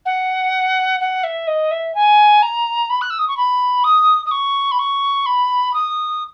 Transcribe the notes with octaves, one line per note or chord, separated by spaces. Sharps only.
F#5
F#5
E5
D#5
E5
G#5
A#5
B5
F#6
E6
D#6
C#6
B5
D#6
D#6
C#6
B5
C#6
B5
D#6